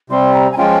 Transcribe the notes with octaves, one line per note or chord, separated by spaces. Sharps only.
C3 G3 C4 C6
A#5
G#5
F3 G#3 C#4 F4 G5